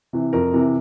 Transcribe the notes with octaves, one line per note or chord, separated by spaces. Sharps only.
C3 E3
F2 A#4
C3 E3